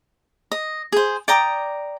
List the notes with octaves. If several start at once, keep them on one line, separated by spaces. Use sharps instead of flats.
D#5
G#4 C5
D5 G5 A#5 D#6